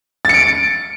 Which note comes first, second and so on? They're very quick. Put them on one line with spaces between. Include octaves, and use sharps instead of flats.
A6 C#7 D7